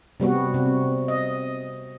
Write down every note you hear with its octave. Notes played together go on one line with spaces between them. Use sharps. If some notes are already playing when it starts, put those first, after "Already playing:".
C3 G3 B3 F#4
C3
D#5